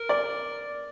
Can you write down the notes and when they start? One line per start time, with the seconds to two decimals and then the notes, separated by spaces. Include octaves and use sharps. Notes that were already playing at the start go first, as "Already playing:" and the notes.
Already playing: A#4
0.09 D5